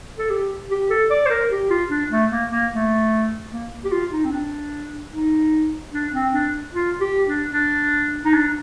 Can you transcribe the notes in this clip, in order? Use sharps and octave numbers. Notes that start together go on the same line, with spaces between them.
A4
G4
G4
A4
D5
C5
A#4
G4
F4
D4
A3
A#3
A#3
A3
A#3
G4
F4
D#4
C4
D4
D#4
D4
C4
D4
F4
G4
D4
D4
D#4
D4